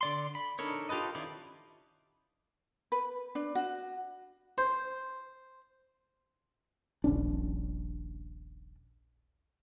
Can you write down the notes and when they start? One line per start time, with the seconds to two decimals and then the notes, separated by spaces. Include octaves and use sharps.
0.01 D3 D5 C6
0.35 B5
0.59 D4 D#4 A4 A#4 C#5
0.89 F4 G4 A4 B4 D#5
1.15 D#3 C#4 E4 F4 D5
2.92 B4
3.35 D4
3.55 F#4
4.58 C5
7.04 D#1 A#1 C#4 D4